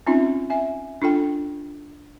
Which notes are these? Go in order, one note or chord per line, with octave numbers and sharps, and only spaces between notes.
C4 C#4 D#4 F4 E5
E5 G#5
D4 F4 A4 G5